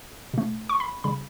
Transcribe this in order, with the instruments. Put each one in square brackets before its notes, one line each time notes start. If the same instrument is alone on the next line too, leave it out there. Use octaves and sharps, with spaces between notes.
[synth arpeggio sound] B2 A3
C#6
B5
C#3 G3 B5